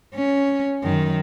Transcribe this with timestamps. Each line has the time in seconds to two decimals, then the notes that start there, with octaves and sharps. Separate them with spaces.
0.14 C#4
0.83 F#2 D#3